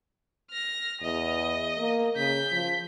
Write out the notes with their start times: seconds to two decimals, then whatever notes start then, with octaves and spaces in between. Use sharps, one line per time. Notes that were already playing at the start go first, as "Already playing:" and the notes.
0.51 F6 A#6
1.01 E2 D#5
1.78 A#3
2.16 C#3 G6 B6
2.52 F3